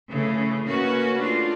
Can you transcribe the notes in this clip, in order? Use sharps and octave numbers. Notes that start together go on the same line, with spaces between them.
C#3 E3 A3
A#3 C#4 F#4 B4
A3 D4 F4